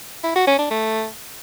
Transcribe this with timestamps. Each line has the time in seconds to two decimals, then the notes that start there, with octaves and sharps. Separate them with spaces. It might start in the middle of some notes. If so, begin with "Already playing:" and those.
0.24 E4
0.36 F#4
0.47 C#4
0.59 D4
0.71 A3